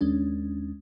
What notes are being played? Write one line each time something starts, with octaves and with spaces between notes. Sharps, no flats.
D#2 G#3 C#4 D4